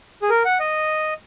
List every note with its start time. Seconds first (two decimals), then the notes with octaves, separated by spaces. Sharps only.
0.22 G#4
0.30 A#4
0.45 F#5
0.60 D#5